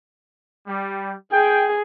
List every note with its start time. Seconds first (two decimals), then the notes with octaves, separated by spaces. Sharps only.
0.67 G3
1.32 G#4 G5